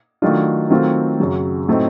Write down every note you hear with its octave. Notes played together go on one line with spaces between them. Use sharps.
D#3 F#3 A3 D4 F4
D#3 F#3 A3 C4 F4
F#2 C#3 F#3
A2 F#3 A3 C4 D#4